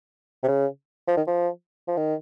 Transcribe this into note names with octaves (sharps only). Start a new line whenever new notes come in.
C3
C#3
F3
D#3
F3
F3
D#3